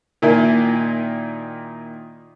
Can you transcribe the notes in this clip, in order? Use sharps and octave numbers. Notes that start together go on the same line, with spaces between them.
A#2 D#3 A#3 E4 G#5